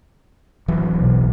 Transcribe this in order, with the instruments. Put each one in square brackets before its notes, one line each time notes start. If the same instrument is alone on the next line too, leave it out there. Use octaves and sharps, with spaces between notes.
[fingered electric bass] D1 E3 F#3
[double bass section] B1